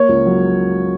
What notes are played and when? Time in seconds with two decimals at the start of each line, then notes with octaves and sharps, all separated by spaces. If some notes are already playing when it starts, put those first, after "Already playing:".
Already playing: A#3 C#5
0.09 C#2
0.26 F#3